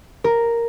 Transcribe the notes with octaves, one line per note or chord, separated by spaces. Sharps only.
A#4